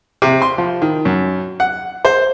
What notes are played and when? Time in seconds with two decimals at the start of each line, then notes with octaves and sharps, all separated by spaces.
0.22 C3
0.42 C6
0.58 F3
0.82 D#3
1.05 F#2
1.60 F#5
2.05 C5